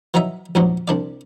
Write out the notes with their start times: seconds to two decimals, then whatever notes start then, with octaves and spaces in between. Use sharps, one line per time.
0.14 E3 F#3 D#4 E5
0.55 A#1 E2 G#2 F#3
0.88 C2 D4 D5